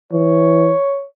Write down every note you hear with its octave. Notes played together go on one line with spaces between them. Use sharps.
E3 C#5